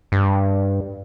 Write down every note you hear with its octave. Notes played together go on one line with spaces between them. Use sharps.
G2